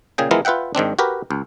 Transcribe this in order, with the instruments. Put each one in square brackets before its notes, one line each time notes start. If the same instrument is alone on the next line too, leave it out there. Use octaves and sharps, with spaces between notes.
[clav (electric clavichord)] A#2 C#3 G#4 G5
E3 F3 G#3 B3 E4 A#4
F4 B4 E5 F#5 G5
G#2 D#3 C4 D4
F#4 G4 A#4 B4
C#2